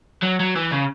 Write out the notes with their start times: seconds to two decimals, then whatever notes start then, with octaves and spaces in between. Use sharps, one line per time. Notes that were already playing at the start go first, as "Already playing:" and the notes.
0.23 F#3
0.40 F#3
0.56 E3
0.71 C#3